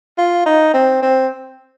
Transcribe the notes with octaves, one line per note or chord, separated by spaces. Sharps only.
F4
D#4
C4
C4